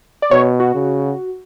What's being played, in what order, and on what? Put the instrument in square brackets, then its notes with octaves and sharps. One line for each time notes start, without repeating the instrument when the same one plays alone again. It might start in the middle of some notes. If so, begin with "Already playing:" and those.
[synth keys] D5
[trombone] B2 [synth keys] C#5
[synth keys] F#4
[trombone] C#3